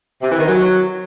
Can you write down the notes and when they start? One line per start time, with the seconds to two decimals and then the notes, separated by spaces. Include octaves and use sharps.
0.22 C3
0.30 E3
0.38 D#3
0.46 F#3